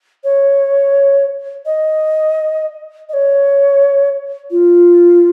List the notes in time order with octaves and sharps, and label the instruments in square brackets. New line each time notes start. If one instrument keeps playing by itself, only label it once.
[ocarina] C#5
D#5
D#5
C#5
F4